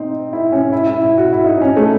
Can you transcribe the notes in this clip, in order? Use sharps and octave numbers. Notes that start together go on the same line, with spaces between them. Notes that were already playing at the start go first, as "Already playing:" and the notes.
Already playing: C4 D#4
E4
C#4
E4
E4
E4
F#4
E4
D#4
C#4
A3